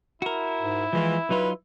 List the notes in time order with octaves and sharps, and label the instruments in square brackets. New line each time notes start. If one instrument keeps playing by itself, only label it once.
[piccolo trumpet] E4 [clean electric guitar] F#4 A#4
[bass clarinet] G#2
[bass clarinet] E3 [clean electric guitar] F3 G#3 F4
[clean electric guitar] F#3 D#4 F4 [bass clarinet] B4